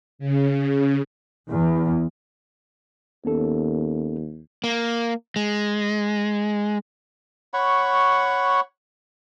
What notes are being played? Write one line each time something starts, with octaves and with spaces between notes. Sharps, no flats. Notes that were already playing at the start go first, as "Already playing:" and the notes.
C#3
E2
D#2 B3 C#4 A4
A#3
G#3
C#5 F#5 B5 C#6